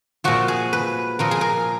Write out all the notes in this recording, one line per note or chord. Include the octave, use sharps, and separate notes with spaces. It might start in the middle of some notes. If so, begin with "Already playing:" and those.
A#2 F3 F#4
G#4
B4
A#2 F3 A#4
G#4
A#4